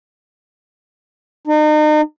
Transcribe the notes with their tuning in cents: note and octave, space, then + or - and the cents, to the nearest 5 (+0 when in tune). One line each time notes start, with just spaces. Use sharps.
D#4 -35